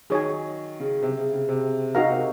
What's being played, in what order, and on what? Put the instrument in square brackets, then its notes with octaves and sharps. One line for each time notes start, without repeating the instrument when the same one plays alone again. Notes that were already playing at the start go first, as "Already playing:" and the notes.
[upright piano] D#3 F#3 [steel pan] G#4 C#5 G#5
[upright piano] C#3
C3
C#3
C#3
C3
[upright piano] C#3 [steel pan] D#4 F#4 A#4 F5 A#5
[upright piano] C3